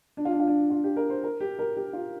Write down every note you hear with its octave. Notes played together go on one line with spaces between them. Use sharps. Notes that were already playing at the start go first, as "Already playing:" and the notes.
D4
F4
D4
F4
D4
F4
G4
A#4
C5
A#4
G4
A#4
G4
F4